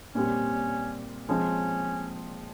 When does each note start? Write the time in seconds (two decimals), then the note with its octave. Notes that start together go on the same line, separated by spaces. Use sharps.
0.15 A#2 G3 C4 C#4 G4
1.28 F3 G#3 C4 C#4